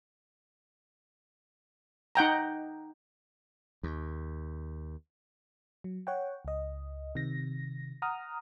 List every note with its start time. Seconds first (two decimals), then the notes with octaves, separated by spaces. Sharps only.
2.15 D#4 F#5 G5 A#5
3.83 D#2
5.84 F#3
6.07 C#5 F#5 G5
6.45 C#2 D#5
7.15 C3 D#3 A#6
8.02 F#5 A#5 D#6 F6